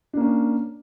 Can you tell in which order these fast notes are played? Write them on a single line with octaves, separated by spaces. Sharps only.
D4 A#3 C#4